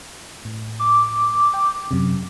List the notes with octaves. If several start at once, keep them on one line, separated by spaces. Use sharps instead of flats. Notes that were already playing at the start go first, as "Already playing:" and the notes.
A2
D6
G5
F#2 C3